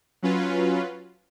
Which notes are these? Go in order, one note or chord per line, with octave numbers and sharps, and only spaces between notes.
F#3 C#4 F4 B4